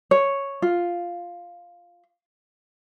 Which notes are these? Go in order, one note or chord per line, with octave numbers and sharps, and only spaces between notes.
C#5
F4